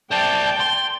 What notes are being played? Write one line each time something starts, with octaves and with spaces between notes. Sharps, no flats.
C5 D5 G5 A5
C6